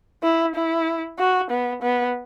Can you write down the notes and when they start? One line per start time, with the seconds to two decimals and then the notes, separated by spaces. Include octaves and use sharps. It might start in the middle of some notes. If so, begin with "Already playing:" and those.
0.23 E4
0.55 E4
1.19 F#4
1.51 B3
1.82 B3